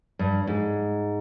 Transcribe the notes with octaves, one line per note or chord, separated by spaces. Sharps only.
G2
G#2